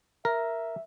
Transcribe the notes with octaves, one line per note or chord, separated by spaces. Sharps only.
A#4 E5